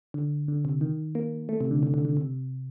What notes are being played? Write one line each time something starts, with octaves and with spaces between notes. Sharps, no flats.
D3
D3
C3
D#3
A#3
A3
C3
D3
D3
D3
D3
C3